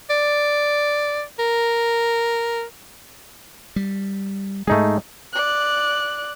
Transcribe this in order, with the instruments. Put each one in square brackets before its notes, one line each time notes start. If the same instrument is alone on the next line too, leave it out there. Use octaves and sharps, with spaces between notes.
[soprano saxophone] D5
A#4
[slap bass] G3
[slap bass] G#2 G#3 [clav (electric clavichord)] A3 D#4 G#4
[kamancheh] D5 F#6